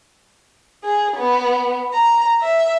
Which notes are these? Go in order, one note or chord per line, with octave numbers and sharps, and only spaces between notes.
G#4
B3
A#5
E5